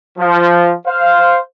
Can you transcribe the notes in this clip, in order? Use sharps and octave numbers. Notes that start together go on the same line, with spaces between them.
F3
C5 F5